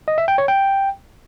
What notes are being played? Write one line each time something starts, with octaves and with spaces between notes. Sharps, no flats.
D#5
E5
G5
C#5
G5